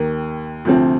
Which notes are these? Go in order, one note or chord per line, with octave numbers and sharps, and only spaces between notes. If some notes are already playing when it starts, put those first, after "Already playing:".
Already playing: D#2 D#3 A#3
D2 C3 F3 C4